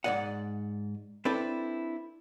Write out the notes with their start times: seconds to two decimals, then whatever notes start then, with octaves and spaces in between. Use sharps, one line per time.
0.04 G#2 D#3 D5 D#5 F#5
1.25 C4 D4 E4 A4 B4